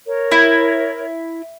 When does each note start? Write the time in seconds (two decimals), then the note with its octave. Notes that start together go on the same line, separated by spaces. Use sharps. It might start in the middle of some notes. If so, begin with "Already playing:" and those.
0.07 A#4 C#5
0.32 E4